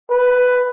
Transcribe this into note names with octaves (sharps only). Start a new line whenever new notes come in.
B4